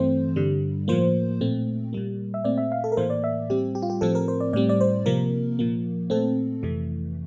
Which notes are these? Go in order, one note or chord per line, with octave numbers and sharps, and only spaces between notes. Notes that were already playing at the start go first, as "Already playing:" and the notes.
Already playing: G2 E3 A3 C4 C5
G2 D3 G3
A2 F3 A#3 C5
A#2 A3 C4
A#2 G3 A#3
E5
A#2 A3 C4 D5
E5
F5
A4
A#4
A2 E3 A#3 C5
D5
E5
A2 G3 C4 G4
G4
F4
G4
A2 F3 C4 A4
A#4
C5
D5
A2 G3 C4 D5
D5
C5
C3 F3 A#3 A#4
A#2 F3 A#3
A#2 A3 C4 A4
F2 C3 E3 A3